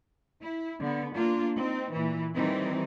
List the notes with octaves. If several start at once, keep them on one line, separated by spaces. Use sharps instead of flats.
E4
D3 B3
A#3 D4 F4
C4 D#4
A#2 E3
D#3 E3 G3 C4 D#4